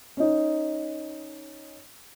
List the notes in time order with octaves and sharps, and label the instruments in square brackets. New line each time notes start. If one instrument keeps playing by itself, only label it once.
[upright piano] C#4 D#4